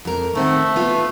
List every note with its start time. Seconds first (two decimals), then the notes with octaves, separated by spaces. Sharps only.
0.05 F2 A#4
0.35 D#3 A3 C4 F#5
0.76 B3 F4